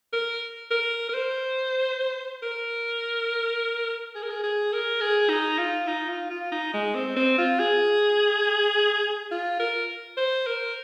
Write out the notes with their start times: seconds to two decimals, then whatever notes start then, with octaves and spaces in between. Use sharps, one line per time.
0.13 A#4
0.71 A#4
1.09 A#4
1.14 C5
2.43 A#4
4.15 G#4
4.23 A#4
4.31 G#4
4.44 G#4
4.73 A#4
5.01 G#4
5.29 D#4
5.59 F4
5.88 D#4
6.09 F4
6.30 F4
6.52 D#4
6.74 G#3
6.95 C4
7.17 C4
7.38 F4
7.60 G#4
9.32 F4
9.60 A#4
10.17 C5
10.47 A#4